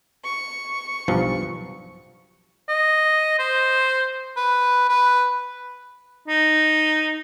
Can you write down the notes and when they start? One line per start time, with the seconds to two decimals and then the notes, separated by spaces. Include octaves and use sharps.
0.24 C#6
1.08 B1 G2 F3
2.69 D#5
3.39 C5
4.36 B4
4.89 B4
6.28 D#4